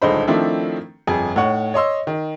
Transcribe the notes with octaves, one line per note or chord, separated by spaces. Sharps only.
D#1 C#2 D3 D#4 C5 B5
D#3 F3 A3 C4 D4 E4
G1 F2 G#4 G#5
A2 D#4 C#5 F#5 C#6
C#5 D#5 C6 E6
D#3